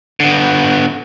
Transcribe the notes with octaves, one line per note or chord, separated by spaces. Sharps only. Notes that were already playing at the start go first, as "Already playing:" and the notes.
D3 B3